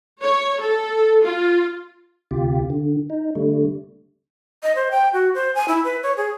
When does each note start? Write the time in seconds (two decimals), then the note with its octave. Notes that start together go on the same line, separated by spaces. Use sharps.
0.22 C#5
0.60 A4
1.23 F4
2.31 D2 C3 F4 G4
2.70 D3
3.10 D#4
3.35 D3 G3 A3
4.63 D#5
4.76 C5
4.91 G5
5.13 F#4
5.35 C5
5.55 G#5
5.68 E4
5.84 B4
6.03 C#5
6.17 G#4